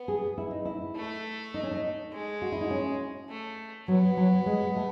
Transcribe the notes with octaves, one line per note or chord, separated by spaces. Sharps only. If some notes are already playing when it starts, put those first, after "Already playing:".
Already playing: B3
G#4
E4
D#4
E4
A3
D#4
C#4
D#4
G#3
F#4
E4
D#4
C#4
A3
F#3 B3
F#3
G#3
A3